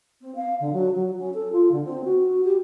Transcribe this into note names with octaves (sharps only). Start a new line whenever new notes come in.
C4
F5
D3
F#3
F#3
C#4
A4
F4
D3
C4
F#4
G4